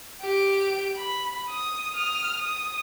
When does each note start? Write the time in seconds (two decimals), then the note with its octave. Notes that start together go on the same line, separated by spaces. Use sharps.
0.22 G4 D7
0.96 B5
1.49 D#6
1.94 D#6 F6
2.37 D#6